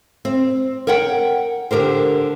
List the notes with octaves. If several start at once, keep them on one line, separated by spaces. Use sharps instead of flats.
C4
A#4 C#5 F#5 G5
D3 G4 A#4 C5